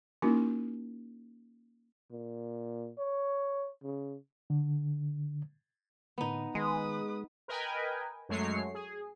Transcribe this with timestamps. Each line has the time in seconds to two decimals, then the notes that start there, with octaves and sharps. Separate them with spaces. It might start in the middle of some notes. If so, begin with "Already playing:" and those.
0.22 A#3 C#4 D#4 E4 F#4 A#4
2.12 A#2
2.98 C#5
3.84 C#3
4.50 D3
6.18 A2 D3 B3 D#4
6.55 D#3 G#3 G#4 B4 D#6
7.48 A#4 B4 D#5 G5 G#5
8.29 F#2 F#3 G#3 A3 C#5 C7
8.74 G#4